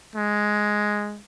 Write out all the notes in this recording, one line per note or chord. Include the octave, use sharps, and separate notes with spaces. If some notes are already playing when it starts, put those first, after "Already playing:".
G#3